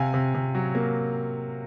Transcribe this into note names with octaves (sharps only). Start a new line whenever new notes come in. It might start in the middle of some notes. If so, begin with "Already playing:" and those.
Already playing: C3 F5 G#5
C3
C3
F#3
A#3